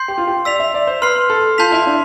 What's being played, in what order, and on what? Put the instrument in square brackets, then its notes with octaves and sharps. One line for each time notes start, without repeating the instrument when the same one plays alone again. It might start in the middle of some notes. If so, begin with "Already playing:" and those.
Already playing: [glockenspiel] C6 G6 C7
[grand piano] G4
F4
G4
[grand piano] D5 [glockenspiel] E6 B6 F7
[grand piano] E5
D5
C5
[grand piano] B4 [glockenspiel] C6 F6 C7
[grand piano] A4
[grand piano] F4 [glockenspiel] A5 C6 G6 B6 F7
[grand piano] E4
D4